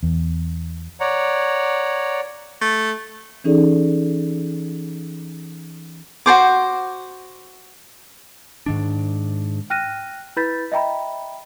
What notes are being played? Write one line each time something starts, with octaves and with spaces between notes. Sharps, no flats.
E2
C#5 D5 F#5 A#5
A3
E3 C#4 D#4 G#4 A4 D5
F#4 A4 C5 D6
G#2 D#3 D4
G5 F6 F#6 A#6 D#7
E4 B4 B5 G6 A6 B6
D#5 E5 G5 A#5 B5